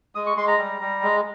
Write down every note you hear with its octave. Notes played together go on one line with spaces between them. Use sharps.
G#3 D#6
C#6
G#3 C6
A#5
G3
G3
G#3